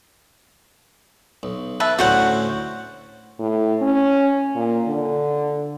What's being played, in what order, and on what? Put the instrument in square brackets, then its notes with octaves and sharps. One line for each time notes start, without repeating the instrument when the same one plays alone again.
[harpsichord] B1
[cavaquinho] B4 E5 A5
[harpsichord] D2 A2 C#4 [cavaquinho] F#4 C5 F#5
[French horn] A2
C#4
A#2
D3